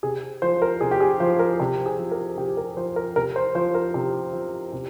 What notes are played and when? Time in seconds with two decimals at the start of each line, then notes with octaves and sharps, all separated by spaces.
0.03 C3 G#4
0.42 F3 C5
0.62 A#4
0.81 C3 G#4
0.91 G4
1.00 G#4
1.20 F3 C5
1.39 A#4
1.60 C3 G4
1.86 G#4
1.99 F3
2.11 A#4
2.38 C3 G4
2.57 A#4
2.77 F3 C5
2.96 A#4
3.16 C3 A#4
3.36 C5
3.55 F3 C5
3.74 A#4
3.94 C3
4.33 F3
4.72 C3